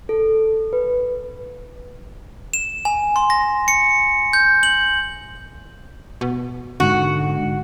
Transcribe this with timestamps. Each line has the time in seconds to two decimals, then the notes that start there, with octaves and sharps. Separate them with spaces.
0.09 A4
0.73 B4
2.54 E7
2.85 G#5
3.16 C6
3.30 A#6
3.68 C#7
4.33 G6
4.63 F#7
6.21 B2
6.80 G#2 D3 F#4